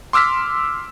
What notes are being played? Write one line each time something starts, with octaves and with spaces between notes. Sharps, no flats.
C6 D6 E6 F6 B6